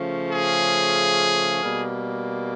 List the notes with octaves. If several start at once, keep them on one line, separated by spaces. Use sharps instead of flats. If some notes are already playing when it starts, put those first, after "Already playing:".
Already playing: C#3 F3 A3 C#4
G#4
B2 G3 A#3